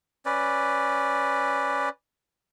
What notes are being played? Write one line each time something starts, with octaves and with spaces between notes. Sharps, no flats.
C#4 B4 D5